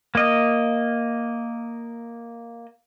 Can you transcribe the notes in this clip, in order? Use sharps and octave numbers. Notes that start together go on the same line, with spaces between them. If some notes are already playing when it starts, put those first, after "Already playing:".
A#3 D#5